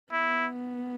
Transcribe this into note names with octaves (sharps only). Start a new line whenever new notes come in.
B3 E4